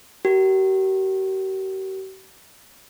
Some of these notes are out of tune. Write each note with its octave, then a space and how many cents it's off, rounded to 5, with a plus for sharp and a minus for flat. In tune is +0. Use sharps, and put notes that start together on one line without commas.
G4 -45 A#4 +0